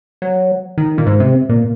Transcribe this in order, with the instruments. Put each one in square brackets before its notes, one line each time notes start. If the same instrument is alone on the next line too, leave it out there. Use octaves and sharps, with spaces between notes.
[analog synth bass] F#3
D#3
A#2
G#2
C3
A#2